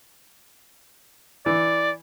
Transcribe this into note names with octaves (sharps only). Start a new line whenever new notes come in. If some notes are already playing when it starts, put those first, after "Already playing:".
E3 D5